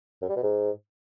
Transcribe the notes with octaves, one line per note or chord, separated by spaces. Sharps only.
F#2
G3
B2
G#2